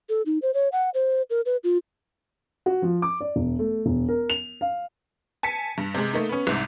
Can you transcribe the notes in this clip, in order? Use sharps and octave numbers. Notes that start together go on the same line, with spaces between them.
A4
D#4
C5
C#5
F#5
C5
A#4
B4
F4
F#4
F3
D6
D5
E1
A3
E1
A#4
F7
F5
G#5 A5 B6 C#7
G2
C3 G#3
A3 A#3 D#4
B3 C#4
C2 G#2 C3